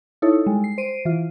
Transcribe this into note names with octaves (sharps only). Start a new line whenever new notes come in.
D#4 E4 A4 C#5
G3 G#3
C7
C5 C7 D7 D#7
E3 F4